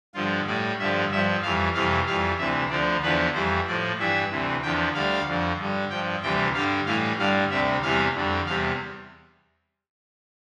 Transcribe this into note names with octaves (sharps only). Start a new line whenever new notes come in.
G2 D3 F3 F4
A2 G3 D5
G2 D3 F3 E5
G2 F3 E5
F2 E3 G3 F5
F2 C3 E3 G3 F5
F2 E3 G3 F5
D2 C3 E3 E5
D2 D3 F3 D5
E2 D3 F3 B4
F2 E3 G3 C5
A2 F3 D5
G2 E3 G3 E5
D2 C3 E3
E2 D3 F3 G5
D2 D3 G3 F5
F2 D3 F3
G2 D3 G3
G2 F3 G5
D2 C3 E3 G3 G5
G2 D3 G3 F5
A2 E3 G3 F5
G2 D3 G3 F5
D2 C3 G3 E5
E2 C3 E3 G3 F5
F2 D3 G3
E2 C3 G3 F5